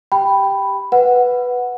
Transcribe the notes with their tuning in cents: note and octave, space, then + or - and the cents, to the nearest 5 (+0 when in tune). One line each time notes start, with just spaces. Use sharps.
G4 +0 G5 +0 B5 +0
B4 +0 F#5 -5